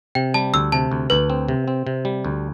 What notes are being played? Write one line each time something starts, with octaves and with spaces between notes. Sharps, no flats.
C3 G5
G3 A5
D2 E6
C3 A5
D2
D2 B4
C4
C3
C4
C3
G3
D2